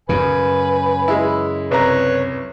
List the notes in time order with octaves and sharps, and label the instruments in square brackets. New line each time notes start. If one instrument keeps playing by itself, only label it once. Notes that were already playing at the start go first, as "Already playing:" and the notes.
[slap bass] F#2 C#3 [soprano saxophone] B4 [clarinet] G#5
[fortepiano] G#3 E4
[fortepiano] C2 A#5 [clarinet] B4 [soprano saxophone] C#5